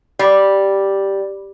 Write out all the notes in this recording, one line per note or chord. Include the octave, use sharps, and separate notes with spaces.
G3